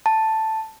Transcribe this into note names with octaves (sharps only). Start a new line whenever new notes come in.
A5